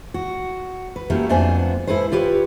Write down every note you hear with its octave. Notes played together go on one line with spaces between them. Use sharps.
F#4
B4
F#3 A3 A#3 C#4 E4 G4
F2 A3 B3 D4 C5 G#5
G#2 E4 A4 B4 C5
F4 G4 B4 C#5